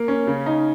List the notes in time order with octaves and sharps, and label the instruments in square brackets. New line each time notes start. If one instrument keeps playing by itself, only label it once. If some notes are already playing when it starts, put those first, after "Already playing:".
Already playing: [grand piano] A#3
C#4
C#3
D#4